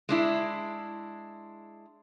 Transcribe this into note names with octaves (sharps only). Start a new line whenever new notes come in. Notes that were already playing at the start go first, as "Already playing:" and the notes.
G#3 D4 E4